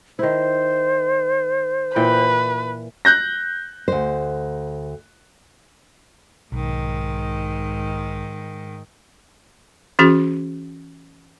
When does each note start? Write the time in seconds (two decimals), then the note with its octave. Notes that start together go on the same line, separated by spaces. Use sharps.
0.19 D#3 E4 C5
1.96 A#2 E3 B4 G5
3.05 F#6 G6 A#6
3.88 D2 C5
6.52 B1 G#2 D#3
9.99 E3 C#4 F#4 G#4